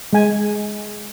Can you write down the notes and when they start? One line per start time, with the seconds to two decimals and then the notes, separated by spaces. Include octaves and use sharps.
0.13 G#3 G#5